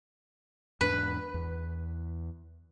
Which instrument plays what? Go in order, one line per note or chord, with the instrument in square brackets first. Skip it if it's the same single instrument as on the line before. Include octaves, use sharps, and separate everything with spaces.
[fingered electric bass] E2 G#2 D4 [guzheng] B4
[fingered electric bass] E2